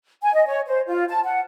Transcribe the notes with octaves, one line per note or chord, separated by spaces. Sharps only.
G#5
D#5
C#5
C5
F4
A5
F#5